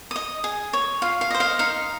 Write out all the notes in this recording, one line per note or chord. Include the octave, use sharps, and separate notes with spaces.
D#5 D#6
G#4
C#5
F4 F5
F5
C5 D#5
F5
D#4 F5